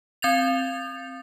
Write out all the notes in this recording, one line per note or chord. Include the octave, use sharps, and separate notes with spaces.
C4 G6 A6 F7